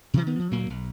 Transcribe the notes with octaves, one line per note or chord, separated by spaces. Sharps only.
C3 D#3 E3
D#3 B3
F3
D2 A#2 F#3 A#3
B1